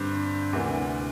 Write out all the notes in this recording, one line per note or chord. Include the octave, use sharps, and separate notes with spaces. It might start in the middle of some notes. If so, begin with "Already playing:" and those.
Already playing: G2 D3 C4
D2 C3 E3 A#3 D4